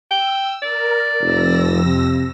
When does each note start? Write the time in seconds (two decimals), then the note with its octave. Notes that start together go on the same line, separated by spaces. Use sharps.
0.11 G5 E6
0.62 A#4 D5
1.21 F1 F2 E6 A#6
1.85 C3